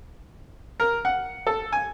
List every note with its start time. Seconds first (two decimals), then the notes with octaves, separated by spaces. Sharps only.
0.80 A#4
1.05 F#5
1.47 A4
1.72 G#5